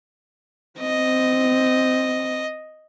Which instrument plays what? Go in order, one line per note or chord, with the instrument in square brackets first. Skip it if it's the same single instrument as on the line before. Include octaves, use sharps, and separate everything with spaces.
[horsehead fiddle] C4 [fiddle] D#5